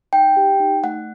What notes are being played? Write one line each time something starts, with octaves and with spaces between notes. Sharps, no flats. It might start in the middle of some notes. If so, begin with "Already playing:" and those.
D#4 G5
G4
D#4
A3 F#5